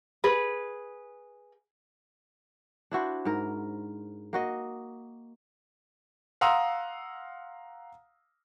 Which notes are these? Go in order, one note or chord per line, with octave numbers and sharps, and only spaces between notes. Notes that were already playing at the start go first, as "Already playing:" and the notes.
G#4 B4
D4 E4 F#4 C5
G#2 A#4
A#3 F#4 D#5
F5 F#5 A#5 C6 D#6 E6